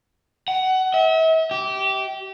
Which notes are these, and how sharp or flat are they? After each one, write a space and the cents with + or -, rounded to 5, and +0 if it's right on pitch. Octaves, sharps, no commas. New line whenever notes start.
F#5 +20
E5 -40
G4 -20